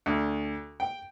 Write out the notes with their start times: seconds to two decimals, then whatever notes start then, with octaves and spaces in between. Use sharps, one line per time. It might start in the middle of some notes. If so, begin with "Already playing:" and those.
0.06 D2
0.80 G5